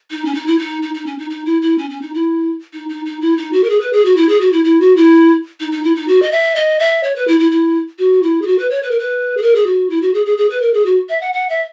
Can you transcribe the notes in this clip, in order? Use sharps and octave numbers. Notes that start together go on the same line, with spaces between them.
D#4
C#4
D#4
E4
D#4
D#4
D#4
C#4
D#4
D#4
E4
E4
C#4
C#4
D#4
E4
D#4
D#4
D#4
E4
D#4
F#4
A#4
G#4
B4
G#4
F#4
E4
G#4
F#4
E4
E4
F#4
E4
D#4
D#4
E4
D#4
F#4
D#5
E5
D#5
E5
C#5
B4
E4
E4
E4
F#4
E4
G#4
F#4
B4
C#5
B4
A#4
B4
G#4
A#4
G#4
F#4
E4
F#4
G#4
G#4
G#4
B4
A#4
G#4
F#4
E5
F#5
F#5
E5